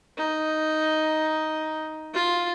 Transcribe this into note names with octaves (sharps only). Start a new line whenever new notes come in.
D#4
F4